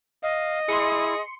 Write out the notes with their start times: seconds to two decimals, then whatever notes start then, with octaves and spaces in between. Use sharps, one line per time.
0.23 D#5 F5
0.69 E4 G#4 C6 C#7